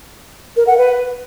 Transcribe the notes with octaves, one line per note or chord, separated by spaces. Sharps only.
A#4
F#5
B4